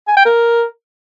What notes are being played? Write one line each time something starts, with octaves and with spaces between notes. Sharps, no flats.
G#5
G5
A#4